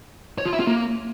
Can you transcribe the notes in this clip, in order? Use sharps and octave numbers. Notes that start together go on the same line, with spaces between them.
C#5
F4
E5
F4
A#3